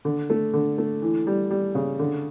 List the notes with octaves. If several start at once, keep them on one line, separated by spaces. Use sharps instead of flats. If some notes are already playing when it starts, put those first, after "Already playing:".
D3
A3
D3
A3
E3
G3
G3
C#3
D3